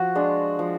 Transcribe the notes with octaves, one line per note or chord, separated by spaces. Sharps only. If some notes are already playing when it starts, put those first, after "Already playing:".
Already playing: F3 F#4
G#3 D4 F4
F3